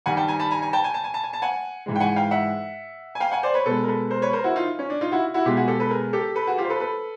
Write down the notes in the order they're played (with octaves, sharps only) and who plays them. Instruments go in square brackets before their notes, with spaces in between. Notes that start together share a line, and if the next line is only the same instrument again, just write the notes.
[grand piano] G2 D#3 G3 F#5 G#5
G5 A5
G#5 A#5
A5 B5
G#5 A#5
G#5 A#5
G5 A5
G#5
A5
G#5
A5
G#5
A5
F#5 G#5
G#2 E3 G#3
G5
F#5 G#5
F5 G5
E5 F#5
G#5
F5 G5
F#5 G#5
C5 D5
B4 C#5
B2 G#3 A4 B4
A#4
A4 B4
A#4 C5
B4 C#5
A#4 C5
E4 F#4
D#4 F4
C#4
D4
D#4 F4
E4 F#4
E4 F#4
B2 G#3 F4 G4
F#4 G#4
G4 A4
A4 B4
G#4 A#4
G4 A4
A4 B4
F#4 G#4
F4 G4
C5
A4 B4
A4 B4